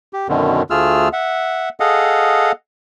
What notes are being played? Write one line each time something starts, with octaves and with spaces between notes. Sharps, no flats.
G4
F#2 B2 D3 D#3
D2 A3 F4 G#4 E6 F6
E5 F#5
G#4 A4 D#5 F5 F#5